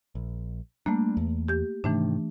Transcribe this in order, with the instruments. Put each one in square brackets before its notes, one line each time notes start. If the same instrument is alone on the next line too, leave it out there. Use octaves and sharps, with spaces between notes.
[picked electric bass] A#1
[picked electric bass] G3 D4 [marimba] A3 A#3
[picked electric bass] E2
[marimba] G4 G6
[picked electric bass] G#2 C3 D#3 [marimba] E3 A3 D4